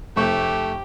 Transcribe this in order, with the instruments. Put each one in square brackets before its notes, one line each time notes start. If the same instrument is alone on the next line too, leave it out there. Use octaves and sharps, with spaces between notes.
[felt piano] F1 C#6 G6 [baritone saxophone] A3 [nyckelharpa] G4